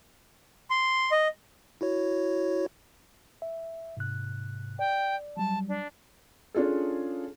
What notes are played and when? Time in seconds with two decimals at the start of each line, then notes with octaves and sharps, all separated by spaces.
0.70 C6
1.12 D#5
1.81 E4 F#4 C#5
3.42 E5
3.97 G#2 C3 F#6
4.79 D5 G5
5.37 F#3 G3 A5
5.69 D4
6.55 C#4 D4 F4 G#4 A4